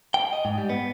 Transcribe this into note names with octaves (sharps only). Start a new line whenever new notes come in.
G5
D#5
G#2
G3
B3